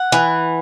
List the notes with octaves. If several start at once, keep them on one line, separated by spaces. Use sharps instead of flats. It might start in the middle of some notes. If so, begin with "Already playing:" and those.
Already playing: F#5
E3